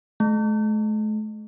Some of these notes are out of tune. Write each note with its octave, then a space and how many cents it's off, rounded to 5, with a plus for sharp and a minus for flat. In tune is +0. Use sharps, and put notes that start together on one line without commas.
A3 -40